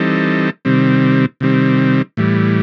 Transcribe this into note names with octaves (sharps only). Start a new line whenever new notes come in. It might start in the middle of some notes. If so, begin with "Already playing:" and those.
Already playing: E3 G3 C4 D#4 A4
C3 D#3 G3 C4
C3 D#3 G3 C4
A2 E3 G3